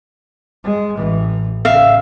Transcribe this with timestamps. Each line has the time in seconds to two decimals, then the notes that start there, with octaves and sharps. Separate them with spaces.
0.64 G#3
0.96 A1 E3
1.65 A2 C#3 E5 F5